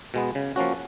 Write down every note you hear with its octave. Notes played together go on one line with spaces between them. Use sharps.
B2 G#3 B3
C#3
F3 A#3 C#4 F#4